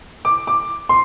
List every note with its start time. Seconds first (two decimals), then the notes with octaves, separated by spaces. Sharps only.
0.25 D6
0.47 D6
0.89 C6